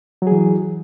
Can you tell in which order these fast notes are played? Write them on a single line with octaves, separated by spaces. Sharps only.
F#3 G#4 E3